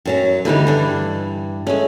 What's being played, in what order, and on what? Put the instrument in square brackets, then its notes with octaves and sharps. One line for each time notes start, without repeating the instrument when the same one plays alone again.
[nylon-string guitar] F#2 F#3 C#4
[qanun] D3 E3 G3 [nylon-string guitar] A3 D#4
[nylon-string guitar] G2 [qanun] E3 D4
[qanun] G#3 A3 [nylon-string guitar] C#4